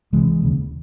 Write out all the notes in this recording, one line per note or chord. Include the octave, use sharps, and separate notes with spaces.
C2 C3 E3 G#3
E1 D#2 C#3